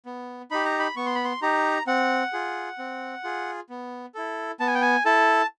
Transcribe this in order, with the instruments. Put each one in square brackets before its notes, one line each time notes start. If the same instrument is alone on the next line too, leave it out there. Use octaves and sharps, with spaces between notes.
[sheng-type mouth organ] B3
D#4 G4 B5
A#5
B5
B3 C#6
C6
B5
C6
D#4 G4 A#5
C4 F#5
F4 G#4
C4
F4 G#4
B3
E4 A4
B3 A5
G#5
G5
G#5
E4 A4 A5